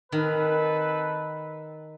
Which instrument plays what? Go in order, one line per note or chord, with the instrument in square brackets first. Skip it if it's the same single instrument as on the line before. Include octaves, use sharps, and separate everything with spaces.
[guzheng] D#3 [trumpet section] C4 A4 B4